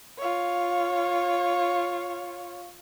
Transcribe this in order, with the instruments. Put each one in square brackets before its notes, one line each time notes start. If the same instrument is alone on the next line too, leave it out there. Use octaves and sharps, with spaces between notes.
[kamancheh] F4 C#5